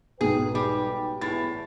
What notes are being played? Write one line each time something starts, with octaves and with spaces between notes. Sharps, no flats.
B1 G#2 G#4 B4 G5
G3
E2 A2 A6